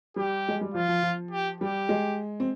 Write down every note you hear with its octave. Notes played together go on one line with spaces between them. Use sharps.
G3 G4
G#3
G3
F3 F4
F3
F3
G4
G3 G4
G#3
C4